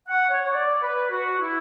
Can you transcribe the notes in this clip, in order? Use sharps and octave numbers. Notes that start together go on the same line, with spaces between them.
F#5
C#5
C#5
D5
B4
F#4
E4